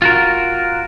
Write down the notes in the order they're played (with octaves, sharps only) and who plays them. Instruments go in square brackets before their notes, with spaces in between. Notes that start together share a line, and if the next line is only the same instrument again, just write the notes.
[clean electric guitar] F4 F#4 A#4